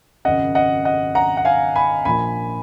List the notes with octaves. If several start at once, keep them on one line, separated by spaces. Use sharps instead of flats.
G#1 F#2 C#3 D#5 F#5
D#5 F#5
D#5 F#5
F#5 A#5
F#5
F5 G#5
G#5 B5
A#1 A#2 F3 G#5 B5